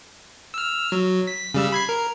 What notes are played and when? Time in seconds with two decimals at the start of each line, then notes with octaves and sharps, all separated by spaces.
0.54 E6 F6
0.92 F#3
1.27 B6
1.54 C#3 G3 E6
1.72 B5 G#6 C7
1.89 A#4